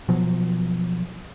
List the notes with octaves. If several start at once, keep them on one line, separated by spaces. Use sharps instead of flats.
B2 F3 F#3